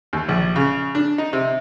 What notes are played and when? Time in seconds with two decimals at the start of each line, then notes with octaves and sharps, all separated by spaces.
0.13 D#2
0.29 A#1
0.56 C#3
0.95 D4
1.18 D#4
1.33 C3